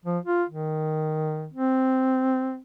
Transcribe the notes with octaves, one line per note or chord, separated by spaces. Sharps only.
F3
F4
D#3
C4